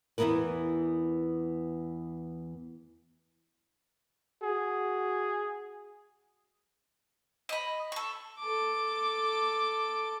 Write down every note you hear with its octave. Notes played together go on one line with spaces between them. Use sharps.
E2 E3 G#3 B3 A#4 B4
F#4 G#4
D#5 B5
A4 C#6
A4 D6